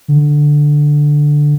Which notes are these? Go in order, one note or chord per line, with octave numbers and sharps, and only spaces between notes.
D3